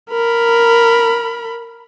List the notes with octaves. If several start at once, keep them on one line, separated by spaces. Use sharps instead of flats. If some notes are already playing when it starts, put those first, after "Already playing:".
A#4 B5